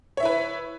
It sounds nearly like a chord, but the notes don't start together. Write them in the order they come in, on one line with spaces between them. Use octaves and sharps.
C#5 E5 E4 B4